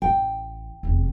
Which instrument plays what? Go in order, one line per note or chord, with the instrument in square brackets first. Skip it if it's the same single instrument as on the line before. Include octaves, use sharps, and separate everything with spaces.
[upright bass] A1 [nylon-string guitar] G5
[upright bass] F1 E2